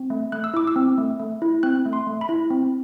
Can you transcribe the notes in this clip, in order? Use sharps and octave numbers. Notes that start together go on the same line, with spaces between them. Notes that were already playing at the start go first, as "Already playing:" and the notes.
Already playing: C4
A3
A3 F#6
E6
E4 D6
E6
C4
A3
A3
E4
C4 F#6
A3
C6
A3
B5
E4
C4